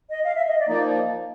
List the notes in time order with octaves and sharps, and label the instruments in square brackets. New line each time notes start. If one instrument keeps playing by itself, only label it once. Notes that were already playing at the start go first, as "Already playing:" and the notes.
[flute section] D#5
F5
E5
D#5
D5
[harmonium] F3 A#3 D#4 [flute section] D5